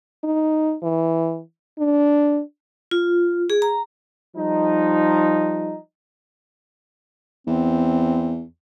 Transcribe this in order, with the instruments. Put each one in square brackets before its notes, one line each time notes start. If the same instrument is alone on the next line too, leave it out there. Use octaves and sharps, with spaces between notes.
[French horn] D#4
E3
D4
[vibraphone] F4
G#4
A#5
[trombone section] F3 G3 D#4
[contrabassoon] E2 [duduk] C4